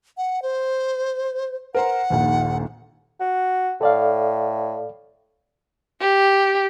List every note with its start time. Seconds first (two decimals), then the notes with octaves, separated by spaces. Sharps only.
0.17 F#5
0.42 C5
1.75 A#4 C5 F#5 A#5
2.10 D#1 A#1 D#2
3.20 F#4
3.81 A2 A4 D5 F5
6.01 G4